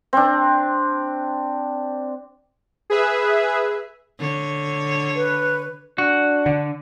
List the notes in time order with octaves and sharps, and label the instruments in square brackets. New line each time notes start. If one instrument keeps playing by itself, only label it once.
[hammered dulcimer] C4 D4
[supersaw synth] G#4 B4 E5
[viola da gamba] D3 C#5
[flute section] B4
[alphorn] D4 [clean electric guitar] F#4
[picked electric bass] D3